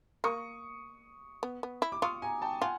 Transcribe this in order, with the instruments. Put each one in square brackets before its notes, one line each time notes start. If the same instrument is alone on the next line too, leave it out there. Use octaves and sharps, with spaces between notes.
[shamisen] A#3 [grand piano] C#6 D#6
[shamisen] B3
B3
E4
[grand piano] D6
[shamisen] F4 [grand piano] C#6 D#6
[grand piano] G#5 A#5
G5 A5
[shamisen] F4 [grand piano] F#5 G#5